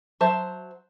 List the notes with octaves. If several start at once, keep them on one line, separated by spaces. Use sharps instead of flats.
F#3 C5 E5 A5